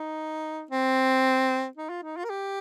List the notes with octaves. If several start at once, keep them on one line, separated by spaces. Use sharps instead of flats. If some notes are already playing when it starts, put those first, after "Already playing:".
Already playing: D#4
C4
D#4
F4
D#4
F4
A#4
G4